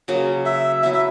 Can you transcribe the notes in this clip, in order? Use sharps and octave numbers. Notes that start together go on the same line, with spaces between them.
C#3 F#3 A#3
E5
F#3 B3 E4 E5
E5